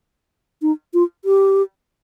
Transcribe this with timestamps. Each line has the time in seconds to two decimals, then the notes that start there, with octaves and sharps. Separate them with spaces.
0.62 D#4
0.94 F4
1.25 G4